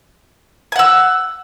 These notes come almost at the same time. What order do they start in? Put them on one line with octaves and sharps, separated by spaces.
G#5 F#5 E6